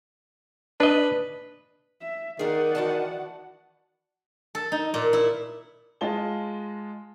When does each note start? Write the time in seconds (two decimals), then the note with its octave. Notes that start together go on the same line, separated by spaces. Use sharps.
0.80 D4 B4 D#5
2.01 E5
2.39 D#3 G#4 A#4 D5 F#5
2.75 E3 F#4 A5
4.55 A4
4.72 D#4
4.94 A#2
5.13 E4
6.01 G#3 F4 D#5 F5 A5 G7